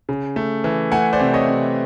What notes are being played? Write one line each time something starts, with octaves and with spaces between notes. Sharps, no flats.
C#3
A3
E3
A3 F#5 G#5
C5 D5
C3
C#5 D#5
C3